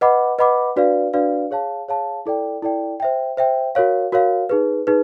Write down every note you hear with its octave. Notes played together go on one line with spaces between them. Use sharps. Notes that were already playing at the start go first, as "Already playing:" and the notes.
B4 D#5 F#5 B5 D6
B4 D#5 F#5 B5 D6
D4 F#4 B4 D5 F5
D4 F#4 B4 D5 F5
G#4 C#5 F5 A5
G#4 C#5 F5 A5
E4 A4 D5 G5
E4 A4 D5 G5
C5 E5 G5
C5 E5 G5
F#4 A#4 C#5 F5
F#4 A#4 C#5 F5
D#4 G#4 B4
D#4 G#4 B4